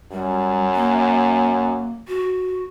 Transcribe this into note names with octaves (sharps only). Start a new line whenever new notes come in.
F#2 G3
A#3
F#4